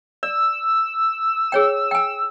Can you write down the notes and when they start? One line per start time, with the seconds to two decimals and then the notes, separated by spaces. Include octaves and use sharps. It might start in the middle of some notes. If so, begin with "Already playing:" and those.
0.23 D5 E6
1.52 G#4 C#5 G5
1.91 G5 G#5